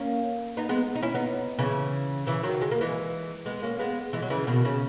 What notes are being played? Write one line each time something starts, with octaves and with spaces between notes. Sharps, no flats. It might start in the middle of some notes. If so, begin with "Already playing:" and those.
Already playing: A#3 C#4
B3 D#4
G#3 B3
D#4
C#4 E4
B3 D#4
C#3 E3
C#3 E3
D#3 F#3
G#3
A#3
E3 G#3
G#3 B3
A#3 C#4
G#3 B3
E3 G#3
F#3
C#3 E3
B2 D#3
C#3